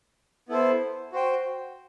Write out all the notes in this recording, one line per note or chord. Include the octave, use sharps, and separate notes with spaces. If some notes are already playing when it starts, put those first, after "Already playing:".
B3 E4 A4 C5
F#4 C5 G5